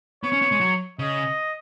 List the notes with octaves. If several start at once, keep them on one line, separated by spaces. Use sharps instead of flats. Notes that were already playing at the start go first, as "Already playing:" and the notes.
B3 C#5
C#4
B3
G#3
F#3
C#3 D#5